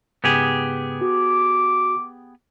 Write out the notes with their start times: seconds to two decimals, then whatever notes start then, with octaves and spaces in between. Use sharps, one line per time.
0.24 G#2 C#3 B3 G4 G#4
1.01 F#4 D6